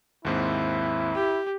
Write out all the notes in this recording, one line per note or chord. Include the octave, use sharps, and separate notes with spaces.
D#2 G#2 C4 E4
G4